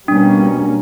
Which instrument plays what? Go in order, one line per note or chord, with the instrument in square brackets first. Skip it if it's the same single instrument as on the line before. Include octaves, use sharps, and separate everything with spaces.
[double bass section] B2 G3 A#3 C#4 [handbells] D4